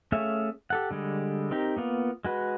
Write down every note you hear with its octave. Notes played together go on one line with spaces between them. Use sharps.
A3 C#4 G#4 E5 F5
G4 A4 F#5
D3 G3 G#3
C4 D#4 G4 A#4
A#3 B3 F4
G#3 F#4 B4